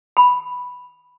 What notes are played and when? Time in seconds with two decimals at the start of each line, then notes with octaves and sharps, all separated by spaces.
0.17 B5